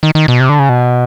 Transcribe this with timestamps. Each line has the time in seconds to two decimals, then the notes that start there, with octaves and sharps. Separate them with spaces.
0.03 D#3
0.15 D#3
0.28 B2
0.40 C3
0.49 D3
0.59 C#3
0.69 B2